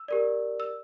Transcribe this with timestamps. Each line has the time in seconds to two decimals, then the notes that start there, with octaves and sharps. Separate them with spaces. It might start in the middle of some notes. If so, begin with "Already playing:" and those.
Already playing: E6
0.08 G4 A#4 D5
0.60 E6